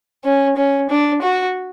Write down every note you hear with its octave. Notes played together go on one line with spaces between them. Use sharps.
C#4
C#4
D4
F#4